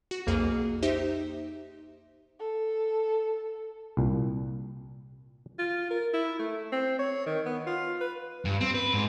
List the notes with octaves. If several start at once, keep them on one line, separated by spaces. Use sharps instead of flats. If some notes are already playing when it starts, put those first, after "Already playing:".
F#4
B1 F2 A#3 G#4
D#4 G4 C5 E5
A4
C2 A#2
F4
A#4
E4
A3
C4
C#5
D#3
B3
F4
B4
G2
C4
B4
G#2